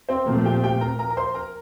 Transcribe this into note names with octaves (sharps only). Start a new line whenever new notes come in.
C4 C5
A#2 F3 A3 A#3 C4 A#4
G4 G5
G4 G5
A#4 A#5
A#4 A#5
A#5
C5 C6
A#4 A#5